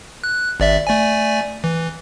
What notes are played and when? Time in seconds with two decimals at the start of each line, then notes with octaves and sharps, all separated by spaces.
0.24 F#6
0.60 G#1 D5 E5
0.87 A3 D5 G#5
1.64 E3